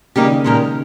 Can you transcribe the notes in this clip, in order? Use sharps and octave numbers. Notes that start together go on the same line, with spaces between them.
C#3 G3 A#3 D#4 G4
D#3
A#2 G#3 C#4 G4 A#4